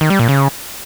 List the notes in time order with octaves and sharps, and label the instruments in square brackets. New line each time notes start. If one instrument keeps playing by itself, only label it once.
[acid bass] D#3
G3
A#2
C#3